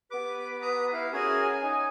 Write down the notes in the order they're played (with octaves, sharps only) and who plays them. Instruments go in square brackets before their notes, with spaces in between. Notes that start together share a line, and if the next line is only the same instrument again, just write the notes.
[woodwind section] B3 G4 B4 [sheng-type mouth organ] D6
[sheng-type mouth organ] A#5 D#6
E4 F5
[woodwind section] C#4 G#5 [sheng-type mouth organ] F#4 G#4 A#4
[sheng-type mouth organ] D#4